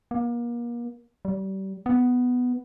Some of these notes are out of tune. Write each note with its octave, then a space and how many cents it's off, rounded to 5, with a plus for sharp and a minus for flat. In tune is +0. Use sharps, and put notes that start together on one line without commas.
A#3 +35
G3 -30
B3 +5